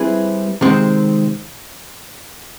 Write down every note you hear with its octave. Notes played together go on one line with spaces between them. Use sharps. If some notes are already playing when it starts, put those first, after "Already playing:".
Already playing: G3 C4 E4 G#4 B4
C3 D#3 G#3 C4